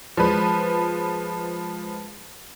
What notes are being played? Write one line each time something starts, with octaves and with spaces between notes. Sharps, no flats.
F3 G#3 B4